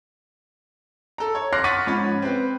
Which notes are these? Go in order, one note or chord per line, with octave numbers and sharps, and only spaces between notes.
A4 A#5
C#5
C6 D6 F6 F#6 A#6 C7
F#5 C#6 A6 B6 D#7
G#2 F3 C#4 B5 A6
C4 B4